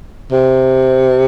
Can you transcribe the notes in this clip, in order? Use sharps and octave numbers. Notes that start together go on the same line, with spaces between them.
C3